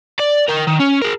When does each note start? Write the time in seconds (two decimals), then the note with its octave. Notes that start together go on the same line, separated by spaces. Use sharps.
0.19 D5
0.49 A#4 G5
0.67 D#3
0.80 C#4
1.02 G#4 A#4